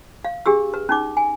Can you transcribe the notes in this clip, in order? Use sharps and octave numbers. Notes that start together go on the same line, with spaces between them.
F5
D4 G4 G#4 E6
B4
C#4 D#4 D6
G#5